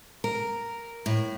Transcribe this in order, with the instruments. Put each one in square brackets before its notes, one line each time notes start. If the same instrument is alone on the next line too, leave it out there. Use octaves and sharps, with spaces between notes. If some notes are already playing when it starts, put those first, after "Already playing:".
[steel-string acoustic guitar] A#4
A2